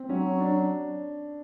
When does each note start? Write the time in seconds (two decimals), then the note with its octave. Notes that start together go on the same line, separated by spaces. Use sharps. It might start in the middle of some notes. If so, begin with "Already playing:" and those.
Already playing: C4
0.09 F#3 C#4
0.40 D4